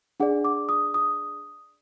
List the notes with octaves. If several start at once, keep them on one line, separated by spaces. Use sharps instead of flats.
D4 G#4 D5 F#5
D6
D#6
D#6